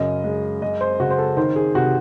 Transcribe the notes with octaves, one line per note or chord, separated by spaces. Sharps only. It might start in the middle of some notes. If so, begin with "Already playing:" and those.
Already playing: F#2 C#3 D#5
G#3
G#3 D#5
C5
C#3 F#4
C5
A4
D#3 C5
G#4
C3 F#4